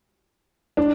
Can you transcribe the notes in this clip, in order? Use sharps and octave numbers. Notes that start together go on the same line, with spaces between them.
D4